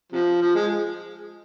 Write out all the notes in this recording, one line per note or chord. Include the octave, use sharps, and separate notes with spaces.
C3 F3
F3
G#3